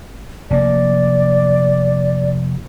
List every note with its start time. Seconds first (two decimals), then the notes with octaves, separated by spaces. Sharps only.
0.51 F1 A#3 D5